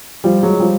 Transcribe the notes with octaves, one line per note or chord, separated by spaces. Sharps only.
F3 G3
F#3 G#3
F3 G3